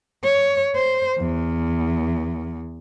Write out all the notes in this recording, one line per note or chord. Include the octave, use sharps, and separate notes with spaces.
C#5
C5
E2